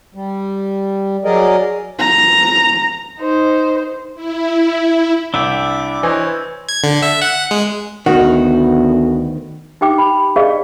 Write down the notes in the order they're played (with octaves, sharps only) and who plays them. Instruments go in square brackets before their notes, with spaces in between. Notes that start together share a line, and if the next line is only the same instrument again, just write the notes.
[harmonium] G3
F#3 G#4 A#4 D5 D#5
[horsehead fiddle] A#5
[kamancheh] D#4 C5
[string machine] E4
[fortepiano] C2 [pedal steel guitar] D4 E4 G5 [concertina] D6 [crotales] E6
[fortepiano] E3 D#5 [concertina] C5 C#5
[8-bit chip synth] G#6
D3
E5
F#5
G#3
[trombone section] D2 B3 [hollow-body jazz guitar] D#3 [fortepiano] F#4
[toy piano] D#4 G4 G5 D6
B5
G#4 D5 D#5 F5